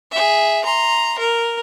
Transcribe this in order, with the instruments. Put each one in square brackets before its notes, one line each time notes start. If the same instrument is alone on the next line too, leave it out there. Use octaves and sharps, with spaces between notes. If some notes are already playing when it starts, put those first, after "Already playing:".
[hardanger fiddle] G#4 E5
A#5 C6
A#4